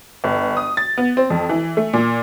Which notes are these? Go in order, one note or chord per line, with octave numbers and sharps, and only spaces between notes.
G1
D#6
A6
B3
C4
F2
E3
A3
A#2